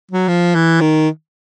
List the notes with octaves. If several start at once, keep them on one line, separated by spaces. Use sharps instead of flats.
F#3
F3
E3
D#3